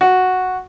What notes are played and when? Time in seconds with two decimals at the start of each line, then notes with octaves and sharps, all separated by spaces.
0.01 F#4